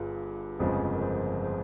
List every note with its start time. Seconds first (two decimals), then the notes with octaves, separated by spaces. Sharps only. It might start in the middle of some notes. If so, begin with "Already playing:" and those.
Already playing: G1 G2 F4 G#4
0.59 G1 F2 C#3 F3 G#3 G#4 C5
0.94 A#4
1.02 G#4 C5
1.43 G#4 C5